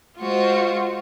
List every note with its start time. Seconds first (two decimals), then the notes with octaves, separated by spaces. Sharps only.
0.19 G#3 F4 F#4 C5